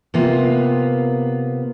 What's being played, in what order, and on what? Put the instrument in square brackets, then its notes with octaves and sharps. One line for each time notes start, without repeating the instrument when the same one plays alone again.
[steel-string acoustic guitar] C3 A#3 B3 F4